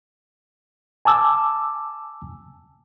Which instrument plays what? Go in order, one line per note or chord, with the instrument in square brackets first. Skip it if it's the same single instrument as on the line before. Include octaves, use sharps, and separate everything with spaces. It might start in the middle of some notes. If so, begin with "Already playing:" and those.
[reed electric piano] G#5 A5 D6 E6